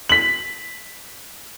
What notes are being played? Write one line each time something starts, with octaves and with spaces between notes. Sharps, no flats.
B6 F#7